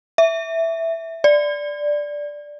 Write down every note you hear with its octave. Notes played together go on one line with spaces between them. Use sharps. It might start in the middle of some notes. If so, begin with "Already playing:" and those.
E5
D5